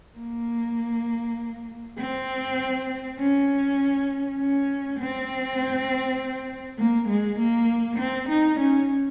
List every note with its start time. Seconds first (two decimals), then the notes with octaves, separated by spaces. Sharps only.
0.18 A#3
1.98 C4
3.19 C#4
4.39 C#4
4.99 C4
6.79 A#3
7.09 G#3
7.39 A#3
7.99 C4
8.29 D#4
8.60 C#4